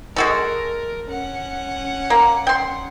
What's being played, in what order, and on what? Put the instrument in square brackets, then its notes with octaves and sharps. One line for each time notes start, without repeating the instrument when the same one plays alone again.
[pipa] G#3 F#4 A4 [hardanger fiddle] A#4
[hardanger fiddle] C#4 F#5
[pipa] A#3
G5 C6